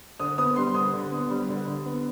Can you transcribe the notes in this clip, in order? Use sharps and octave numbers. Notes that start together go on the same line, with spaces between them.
D3 D#6
B3 D#6
G3 C6
D3 D#6
D3
B3
G3
D3
D3
B3